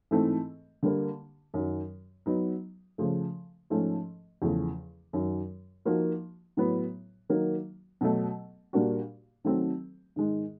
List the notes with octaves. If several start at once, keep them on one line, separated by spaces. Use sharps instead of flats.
G#2 E3 A3 C4
D3 G3 A#3
F#2 D#3 F#3
F#3 B3 D#4
C#3 F3 A3
G#2 F3 A3 C#4
E2 C#3 F3 A3
F#2 D#3 F#3
F3 A#3 D#4 F#4
A2 F#3 B3
D#3 F#3 A#3 D#4
B2 F#3 A3
A#2 G3 A#3 D4 F#4
D#3 F#3 A3 C4
G#2 D#3 G#3